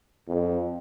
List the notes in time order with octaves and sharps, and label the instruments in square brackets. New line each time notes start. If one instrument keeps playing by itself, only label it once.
[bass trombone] F2